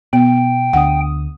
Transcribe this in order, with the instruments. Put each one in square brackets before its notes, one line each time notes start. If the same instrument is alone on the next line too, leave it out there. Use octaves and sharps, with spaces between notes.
[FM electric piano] B2 [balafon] B3 [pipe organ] G5
[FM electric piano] D2 D3 D#6 [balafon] F#5